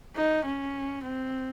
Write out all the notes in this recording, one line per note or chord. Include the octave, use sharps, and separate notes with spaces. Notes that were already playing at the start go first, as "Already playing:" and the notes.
D#4
C#4
C4